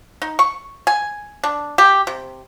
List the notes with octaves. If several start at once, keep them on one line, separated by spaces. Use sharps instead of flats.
D#4
C#6
G#5
D4
G4
C3